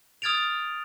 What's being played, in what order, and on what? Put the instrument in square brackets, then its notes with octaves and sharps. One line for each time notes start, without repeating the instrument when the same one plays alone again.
[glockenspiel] D#6 F6 G#6 A6 D7 F7